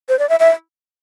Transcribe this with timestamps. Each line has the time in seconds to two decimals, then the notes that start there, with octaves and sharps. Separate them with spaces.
0.09 C5
0.19 D5
0.29 E5
0.40 E5